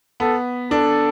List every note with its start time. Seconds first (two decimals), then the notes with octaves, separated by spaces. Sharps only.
0.20 B3 A4
0.71 D4 A4